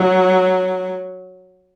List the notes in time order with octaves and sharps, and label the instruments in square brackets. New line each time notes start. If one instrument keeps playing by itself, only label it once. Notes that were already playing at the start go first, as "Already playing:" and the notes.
Already playing: [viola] F#3